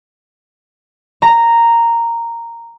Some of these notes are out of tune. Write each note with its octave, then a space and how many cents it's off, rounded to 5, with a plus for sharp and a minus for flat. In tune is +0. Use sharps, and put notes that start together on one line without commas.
A#5 -5